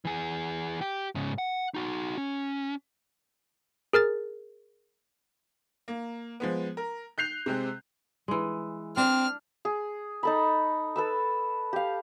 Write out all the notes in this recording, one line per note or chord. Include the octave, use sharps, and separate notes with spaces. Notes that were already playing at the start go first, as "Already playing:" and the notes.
E3 G#4
G4
G#2 C#3
F#5
D#4 F#4
C#4
G#4 A#4 F6 A6
A#3
F3 G#3 B3
A#4
F#6 G6 C7 F7
C3 G#3 C4 F#6
E3 G#3
C4 D4 F6
G#4
D#4 A4 B5
A4 B4 E6
G4 F5